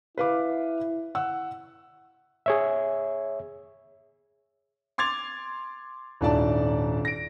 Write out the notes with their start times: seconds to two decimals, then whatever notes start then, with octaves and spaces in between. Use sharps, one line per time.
0.18 E4 B4 F5 D6
1.15 F#5 E6
2.46 G#4 C#5 E5
4.98 C6 D6 G#6 A6 F7
6.21 D#1 G#2 D4 E4 D5 A5
7.05 A#6 D7